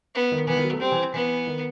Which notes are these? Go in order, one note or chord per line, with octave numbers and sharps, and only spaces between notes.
B3
D#3
E3 B3
D#3
F#3
A3
G3 C4
E3
E3 B3
D#3